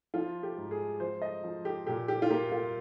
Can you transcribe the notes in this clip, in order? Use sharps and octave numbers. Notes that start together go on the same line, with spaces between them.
F3 F4
G4
G#2
G#4
F3 C5
D#5
F3
G4
A#2 G4
G4
F4
A#3 G4
F4